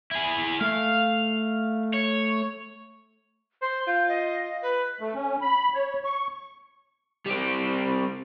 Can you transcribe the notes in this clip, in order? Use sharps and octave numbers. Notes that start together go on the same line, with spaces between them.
E4 G#4
A3 F5
C#5
C5 C6
F4 G6
D#5
B4
A3
C#4
B5
C#5
C#6
G3 C4